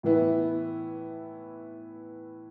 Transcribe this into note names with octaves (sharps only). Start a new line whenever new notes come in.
A2 E3 B3 E4